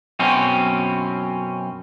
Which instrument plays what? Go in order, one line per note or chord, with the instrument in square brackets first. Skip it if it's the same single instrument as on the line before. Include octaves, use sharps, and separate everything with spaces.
[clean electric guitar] F#2 B2 C4 C#4